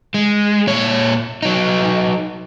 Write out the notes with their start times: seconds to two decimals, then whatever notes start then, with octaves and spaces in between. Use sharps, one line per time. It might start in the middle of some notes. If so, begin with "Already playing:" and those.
0.14 G#3
0.67 A#2 C#5
1.42 F#3 D#4